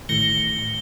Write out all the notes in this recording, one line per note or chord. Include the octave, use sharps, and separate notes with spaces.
A1 A2 D#3 A#6 C#7 G7